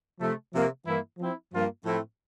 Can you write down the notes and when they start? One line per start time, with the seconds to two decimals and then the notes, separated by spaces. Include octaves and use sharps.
0.20 C3 F3 A3
0.52 C3 F3 A#3
0.86 G2 E3 A#3 E4
1.18 F3 C4 E4
1.52 G2 F3 A#3 F4
1.85 A2 F3 A3 C4 E4